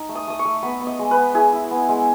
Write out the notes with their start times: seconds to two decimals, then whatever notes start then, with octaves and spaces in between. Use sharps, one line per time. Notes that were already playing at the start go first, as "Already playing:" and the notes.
Already playing: D#4
0.09 A3
0.15 D#6
0.27 A3 D#6
0.39 C#6
0.45 A3
0.63 B3 B5
0.81 B3
0.87 D#5
0.99 G#3
1.11 B4
1.17 B3
1.34 E4 G#4
1.53 E4
1.71 B3
1.89 G#3